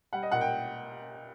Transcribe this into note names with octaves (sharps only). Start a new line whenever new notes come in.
G3 F#5
D#5
A#2 F#5
G5